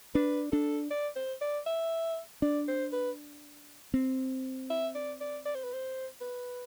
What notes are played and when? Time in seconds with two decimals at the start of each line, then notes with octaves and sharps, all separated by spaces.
0.14 D4 B4
0.52 D4 A4
0.90 D5
1.16 C5
1.41 D5
1.66 E5
2.42 D4 D5
2.68 C5
2.92 B4
3.94 C4
4.70 E5
4.95 D5
5.21 D5
5.45 D5
5.55 C5
5.63 B4
5.73 C5
6.21 B4